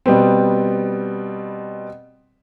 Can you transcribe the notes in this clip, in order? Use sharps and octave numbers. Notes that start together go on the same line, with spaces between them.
B2 G3 B3 C4